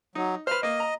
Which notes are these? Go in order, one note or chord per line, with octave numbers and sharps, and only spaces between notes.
F#3 D#4
B4 C5 F6
A#3 D#5
A#5